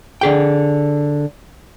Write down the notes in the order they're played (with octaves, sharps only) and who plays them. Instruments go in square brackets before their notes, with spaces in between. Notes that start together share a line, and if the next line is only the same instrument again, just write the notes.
[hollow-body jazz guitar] D3 G#4 G5